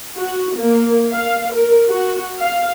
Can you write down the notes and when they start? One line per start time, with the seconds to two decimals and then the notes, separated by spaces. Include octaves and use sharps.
0.18 F#4
0.57 A#3
1.11 F5
1.54 A#4
1.89 F#4
2.40 F5